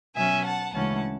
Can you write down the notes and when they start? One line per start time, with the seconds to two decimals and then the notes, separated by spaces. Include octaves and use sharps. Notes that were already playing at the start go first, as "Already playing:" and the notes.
0.15 B2 F#3 C#4 E5 G#5
0.44 F#5 A5
0.73 D2 C#3 E3 G#3 C#4 F#5 A5